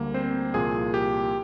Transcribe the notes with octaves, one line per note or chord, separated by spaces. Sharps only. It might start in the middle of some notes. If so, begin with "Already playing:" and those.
Already playing: D2 D3 G3 A#3
C4 C5
C2 A#2 F3 A#3 G#4 G#5
G4 G5